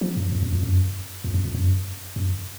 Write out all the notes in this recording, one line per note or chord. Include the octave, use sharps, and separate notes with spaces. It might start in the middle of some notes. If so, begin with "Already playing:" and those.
F3
F#2
F2
F#2
F2
F#2
F2
F#2
F2
F#2
F#2